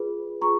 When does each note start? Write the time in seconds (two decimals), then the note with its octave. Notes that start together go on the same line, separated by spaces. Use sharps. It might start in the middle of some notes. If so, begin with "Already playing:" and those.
Already playing: F4 G#4 B4
0.41 F4 G#4 A#5 C#6